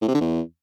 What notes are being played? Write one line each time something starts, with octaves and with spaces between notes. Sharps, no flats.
A2
C3
D3
E2